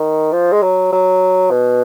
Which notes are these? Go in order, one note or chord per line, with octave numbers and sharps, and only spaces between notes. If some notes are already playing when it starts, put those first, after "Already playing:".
Already playing: D#3
F3
G#3
F#3
F#3
B2